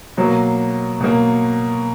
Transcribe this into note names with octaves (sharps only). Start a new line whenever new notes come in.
B2 F#3 A#3
B2 F#3 A#3